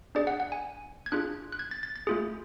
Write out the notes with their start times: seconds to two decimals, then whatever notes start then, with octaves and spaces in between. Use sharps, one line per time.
0.15 D4 G#4 D5
0.27 F#5
0.40 F#5
0.52 G#5
1.06 G#6
1.12 D4 F4 G#4 F#6
1.52 F#6
1.59 G#6
1.71 A6
1.83 A6
1.96 A6
2.07 A3 F4 G#4